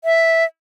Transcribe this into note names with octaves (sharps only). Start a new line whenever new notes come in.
E5